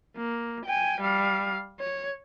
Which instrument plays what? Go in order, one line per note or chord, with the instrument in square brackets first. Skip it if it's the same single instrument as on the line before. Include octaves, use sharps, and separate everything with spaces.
[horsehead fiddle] A#3
G5 G#5
G3 F5
C#5